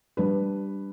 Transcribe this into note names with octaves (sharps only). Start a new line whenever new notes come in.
G3 D4 B4